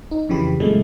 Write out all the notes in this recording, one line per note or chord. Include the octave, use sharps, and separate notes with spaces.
D#4
F2 C#3 E3 G4 B5
F#2 A#2 C#3 E3 G#3 A3